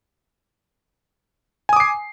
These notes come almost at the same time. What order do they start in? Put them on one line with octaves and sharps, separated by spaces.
G#5 D#6 D6 C7